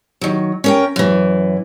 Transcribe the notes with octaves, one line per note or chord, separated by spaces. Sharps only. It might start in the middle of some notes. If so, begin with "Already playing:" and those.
D#3 F#3
C#4 A#4 G5
F#2 E3